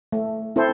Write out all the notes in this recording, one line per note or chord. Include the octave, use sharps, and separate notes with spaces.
A3
C4 E4 A4 C5